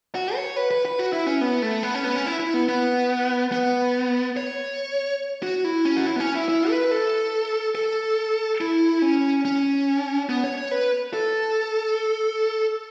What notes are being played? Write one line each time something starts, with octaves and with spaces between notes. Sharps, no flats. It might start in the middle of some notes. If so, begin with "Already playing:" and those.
F#4
C#5
B4
B4
B4
F#4
E4
C#4
B3
A3
B3
C#4
B3
C#4
E4
E4
B3
B3
B3
C#5
F#4
E4
C#4
F#4
E4
B3
C#4
E4
E4
B4
A4
A4
E4
C#4
C#4
B3
C#5
C#5
B4
A4